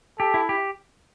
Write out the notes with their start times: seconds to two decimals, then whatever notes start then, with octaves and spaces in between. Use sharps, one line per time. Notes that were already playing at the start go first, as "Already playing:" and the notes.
0.19 G4 A4
0.34 E4
0.49 G4